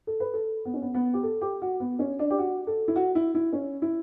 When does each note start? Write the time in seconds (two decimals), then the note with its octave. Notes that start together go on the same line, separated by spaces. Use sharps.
0.07 A4
0.20 B4
0.34 A4
0.65 B3
0.74 C#4
0.82 B3
0.94 B3
1.13 G4
1.23 A4
1.41 G4
1.62 F#4
1.80 B3
1.99 C#4
2.19 D4
2.30 G4
2.39 F#4
2.67 A4
2.88 E4
2.96 F#4
3.15 E4
3.35 E4
3.53 C#4
3.82 E4